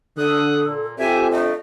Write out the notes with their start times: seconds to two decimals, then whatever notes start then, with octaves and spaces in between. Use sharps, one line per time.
0.18 D3 A4 D#6 F#6
0.63 A#2
0.99 C4 F4 G4 A4 E5 G#5
1.31 D3 A3 D#5